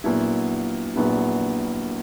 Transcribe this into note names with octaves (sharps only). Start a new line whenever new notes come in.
A#1 A#2 F#3 B3 E4
A#1 A#2 F#3 B3 E4